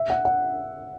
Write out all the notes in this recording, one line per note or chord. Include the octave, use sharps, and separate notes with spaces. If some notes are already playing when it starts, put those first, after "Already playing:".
Already playing: E5
F#5
F#5